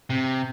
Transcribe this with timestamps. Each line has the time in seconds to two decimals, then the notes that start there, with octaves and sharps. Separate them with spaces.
0.10 C3